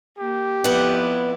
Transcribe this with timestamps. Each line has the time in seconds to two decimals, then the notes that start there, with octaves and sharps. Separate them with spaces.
0.18 A#3 G4
0.64 F2 B3 E4 D5 F#5